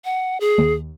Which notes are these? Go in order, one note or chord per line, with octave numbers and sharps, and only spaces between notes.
F#5
G#4
D#2